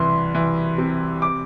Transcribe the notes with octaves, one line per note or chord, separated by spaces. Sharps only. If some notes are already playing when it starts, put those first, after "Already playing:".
Already playing: C2 E3 C6
E3
C3
D6